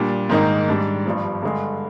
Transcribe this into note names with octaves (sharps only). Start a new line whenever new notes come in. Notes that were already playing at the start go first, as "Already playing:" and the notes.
Already playing: A#2 G3 D4
G#2 D#3 A#3 D#4
G#2 G3 D4
G1 G2 F3
G2 D3 G#3